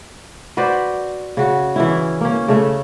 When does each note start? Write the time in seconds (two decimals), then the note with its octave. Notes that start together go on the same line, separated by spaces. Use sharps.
0.57 F#4 B4 C5 D5
1.37 C#3 F#4
1.76 E3 C#4 E4
2.21 A#3 C#4
2.48 C#3 A3